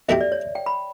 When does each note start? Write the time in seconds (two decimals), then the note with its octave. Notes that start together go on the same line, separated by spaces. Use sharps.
0.08 B1 B2 A3 E4 G4 E5
0.21 D5
0.32 C#5
0.55 G5
0.66 B5